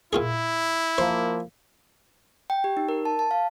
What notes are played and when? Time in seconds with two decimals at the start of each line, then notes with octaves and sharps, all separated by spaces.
0.13 A#2 E4 F4 G#4
0.98 F3 A#3 C5
2.50 G5
2.64 G4
2.77 D#4
2.89 A#4
3.05 A5
3.19 A5
3.31 F5